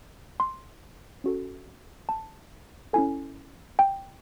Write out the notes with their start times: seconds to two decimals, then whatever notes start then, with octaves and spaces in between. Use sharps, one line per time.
0.40 C6
1.24 C#4 F#4 A4
2.09 A5
2.93 C#4 E4 A4 G#5
3.79 G5